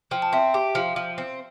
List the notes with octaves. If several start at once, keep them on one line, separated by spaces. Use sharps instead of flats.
F3 G5
A5
C4 E5 G5
G4
F3 F5
F3
C4